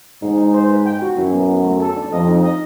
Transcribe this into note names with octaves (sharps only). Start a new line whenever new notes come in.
G#2 D#4
D#4
C5
B4
G5
F#4
F#2 E4
B3
E4
A3
A4
D4
F2 D#5
D#4
D#5